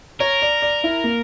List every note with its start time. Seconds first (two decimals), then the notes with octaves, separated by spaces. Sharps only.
0.20 A#4 C#5
0.42 D5
0.62 D5
0.84 E4
1.04 A#3